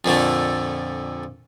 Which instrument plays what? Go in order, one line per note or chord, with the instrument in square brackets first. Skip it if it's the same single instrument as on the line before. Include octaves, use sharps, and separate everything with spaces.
[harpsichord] F2 A#2 D3 A3